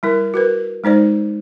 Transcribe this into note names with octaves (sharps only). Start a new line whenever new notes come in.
G3 E4 A#4
F#4 A#4 B4
G#3 D#4 C5 D5